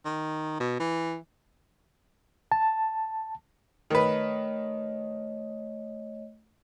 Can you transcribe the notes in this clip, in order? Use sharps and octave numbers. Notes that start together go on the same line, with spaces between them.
D#3
B2
E3
A5
D#3 A3 B4 C#5 D#5